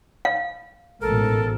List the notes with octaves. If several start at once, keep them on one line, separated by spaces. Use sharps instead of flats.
F5
A1 G#2 B2 A4 A#4